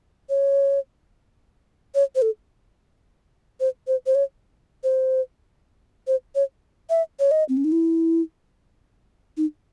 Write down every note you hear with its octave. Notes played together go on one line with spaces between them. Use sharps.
C#5
C#5
C5
A4
C5
C5
C5
C#5
C5
C5
C#5
E5
C#5
D#5
C4
C#4
D#4
E4
D#4